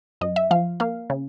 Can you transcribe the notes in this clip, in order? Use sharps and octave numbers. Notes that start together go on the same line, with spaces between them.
F#2 D#5
E5
F3 F5
A#3 F5
C#3